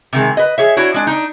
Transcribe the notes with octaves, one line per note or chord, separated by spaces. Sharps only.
C3 D#3 G#3
B4 D#5
G#4 C#5 E5
D4 E4 F#4 C#5
G#3 D4
D4 D#4